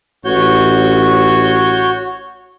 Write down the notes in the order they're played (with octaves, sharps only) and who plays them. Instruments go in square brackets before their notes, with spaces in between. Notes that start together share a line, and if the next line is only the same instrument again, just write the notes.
[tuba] A1 [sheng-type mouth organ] F#4 C#5 G6